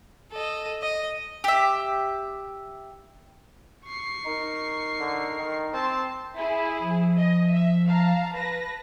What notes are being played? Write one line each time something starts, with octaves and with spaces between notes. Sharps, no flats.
A4 D#5
D#5
G4 E5
C#6 C7
D#4 A#4
D3
D#3
C4 A5 C6
E4 G#4 E5
F3
D#5
E5
F5 A5 A#5
B4 A5 A#6